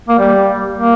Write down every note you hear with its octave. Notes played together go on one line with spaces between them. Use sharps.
A#3
G3
A#3